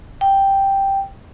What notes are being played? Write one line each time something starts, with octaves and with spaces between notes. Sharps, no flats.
G5